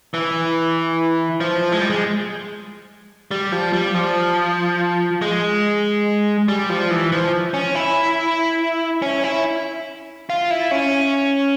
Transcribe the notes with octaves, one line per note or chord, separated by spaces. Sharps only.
E3
F3
G#3
G3
G#3
G3
F3
G3
F3
G#3
G3
F3
E3
F3
C#4
E4
C#4
E4
F4
E4
C#4